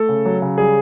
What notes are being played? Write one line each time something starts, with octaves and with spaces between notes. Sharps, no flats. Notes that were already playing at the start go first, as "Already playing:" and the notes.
Already playing: A3 A4
C#3
F#3
C#3
G3 G#4